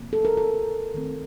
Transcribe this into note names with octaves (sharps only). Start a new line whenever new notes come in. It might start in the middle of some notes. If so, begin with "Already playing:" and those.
Already playing: C3 F3 A#3
A4
A#4
A4
D#3 A3 C4